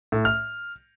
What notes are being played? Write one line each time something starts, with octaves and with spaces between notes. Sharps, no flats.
A2
F6